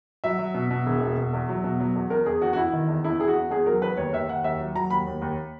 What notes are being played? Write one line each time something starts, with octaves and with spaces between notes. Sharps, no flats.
F#3 E5
F#3
B2
B2
E1
B2
B2
E2
F#3
B2
F#3
E2
E2 A#4
E2 G#4
E2 F#4
F#4
E2 E4
D#3
E2
E2 E4
E2 G#4
F#4
E2
E2 G#4
F#3 A#4
E2 B4
D#2 C#5
D#2 E5
D#2 F#5
D#2 E5
F#3
F#3 A#5
D#2 B5
D#2
D#2